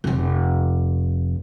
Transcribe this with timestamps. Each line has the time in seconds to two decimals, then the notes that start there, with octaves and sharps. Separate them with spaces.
0.04 F1 F2